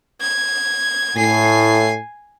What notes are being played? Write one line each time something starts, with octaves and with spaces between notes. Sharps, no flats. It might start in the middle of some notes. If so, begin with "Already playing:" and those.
G#6
A2 G#5 C7